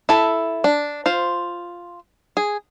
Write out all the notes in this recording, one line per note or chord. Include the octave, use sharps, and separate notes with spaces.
E4 A4
D4
F4 C5
G#4